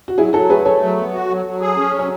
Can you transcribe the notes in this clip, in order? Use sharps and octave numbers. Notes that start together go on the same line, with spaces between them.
F#4
F#3 E4 G#4
F#3 F#4 A4
A3 G#4 B4
A3 A4 C#5
F#3
B3
F#4
F#3
F#3
G#4
C#4
F#3
C#5